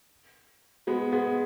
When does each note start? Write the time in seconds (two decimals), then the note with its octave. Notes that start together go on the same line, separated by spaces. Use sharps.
0.87 G#3 B3
1.12 G#3 B3